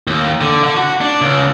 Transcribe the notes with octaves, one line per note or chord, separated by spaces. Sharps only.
D#2
D3
D3
F#4
D4
C#2